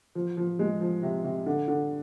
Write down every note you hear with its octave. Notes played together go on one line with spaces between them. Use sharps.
F3
F3
G#3
F3
C3
C3
D3
D3